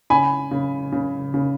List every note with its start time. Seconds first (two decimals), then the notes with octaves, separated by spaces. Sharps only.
0.10 C#3 G#5 B5
0.51 C#3
0.92 C#3
1.34 C#3